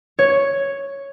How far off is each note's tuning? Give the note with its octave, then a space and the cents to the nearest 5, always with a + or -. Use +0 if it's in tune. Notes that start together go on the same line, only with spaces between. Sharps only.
C#5 +0